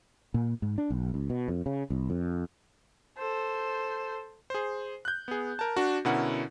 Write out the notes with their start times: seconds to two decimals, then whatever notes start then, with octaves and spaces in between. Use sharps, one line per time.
0.34 A#2
0.62 G#2
0.78 D4
0.90 B1
1.14 C#2
1.30 B2
1.48 F2
1.66 C#3
1.90 C2
2.10 F2
3.18 A4 C5
4.50 G#4 C5
5.05 F#6 G6
5.28 B3 G#4
5.59 A#4 A5
5.77 D4 F#4
6.05 B2 D3 C#4 E4 A#4 F#5